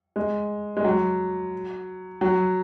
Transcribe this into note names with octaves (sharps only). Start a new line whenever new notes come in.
G#3
G#3
F#3
F#3